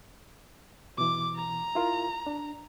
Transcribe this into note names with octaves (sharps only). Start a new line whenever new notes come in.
B2 E3 D6
A#5
E4 F4 A#4
D4